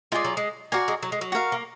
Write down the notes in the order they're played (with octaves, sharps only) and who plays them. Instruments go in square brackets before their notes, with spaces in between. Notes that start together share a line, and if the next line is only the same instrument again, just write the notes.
[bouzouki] G#3 [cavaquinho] F4 G#4 D5
[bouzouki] F#3
G#3
[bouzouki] A#3 [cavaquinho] F#4 A#4 D5 G#5
[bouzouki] G#3
F#3
G#3
F#3
[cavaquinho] F#4 A#4 F5
[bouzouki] A#3